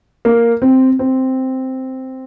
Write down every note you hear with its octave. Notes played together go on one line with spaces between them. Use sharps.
A#3
C4
C4